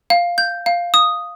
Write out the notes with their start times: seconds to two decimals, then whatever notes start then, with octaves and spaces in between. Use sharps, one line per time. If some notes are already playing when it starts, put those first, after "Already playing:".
0.10 F5
0.38 G6
0.66 F5
0.94 D#6